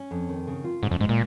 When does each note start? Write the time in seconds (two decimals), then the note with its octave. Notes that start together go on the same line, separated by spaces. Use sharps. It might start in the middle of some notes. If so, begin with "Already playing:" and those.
Already playing: C#4
0.11 F2
0.29 D#3
0.47 C#3
0.64 F4
0.82 G#2 C#3
0.91 F2
1.00 G#2 G#3
1.09 A#2